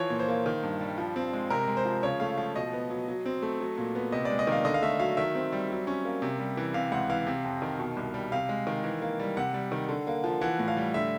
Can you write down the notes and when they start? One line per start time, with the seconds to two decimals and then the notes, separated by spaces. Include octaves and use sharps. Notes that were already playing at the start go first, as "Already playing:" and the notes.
Already playing: E3 F3 C#5
0.10 A#2
0.19 C5
0.28 A#3
0.46 D#3
0.63 G2
0.81 G3
0.98 F3
1.16 C4
1.33 G#3
1.50 C3 A#4
1.68 G#3
1.77 C5
1.85 F3
2.03 C#3 C#5
2.20 A3 F5
2.38 F3 F5
2.55 B2 D#5
2.73 B3
2.90 F#3
3.08 F#3
3.26 C4
3.43 A3
3.60 F#3
3.78 A#2
3.95 B3
4.12 C3 D#5
4.25 G#3 D5
4.39 D#5
4.47 D#3 F5
4.65 D3 D#5
4.74 F5
4.82 A3 E5
5.00 F#3 F5
5.17 D#3 E5
5.35 C4
5.53 G3
5.70 F#3
5.87 C#4
6.05 A#3
6.22 C3
6.39 G3
6.57 E3
6.74 C3 F5
6.92 C#2 F#5
7.10 E3 F5
7.27 C3
7.44 F2
7.62 D#3
7.79 B2
7.97 C2
8.14 G3
8.32 C3 F5
8.49 G#3
8.67 D#3
8.84 E3
9.02 A#3
9.20 G3
9.37 C3 F#5
9.54 G3
9.72 D#3
9.88 D3
10.07 A#3
10.24 F3
10.41 E3 F#5
10.59 A2
10.68 F5
10.77 G3
10.94 D3 E5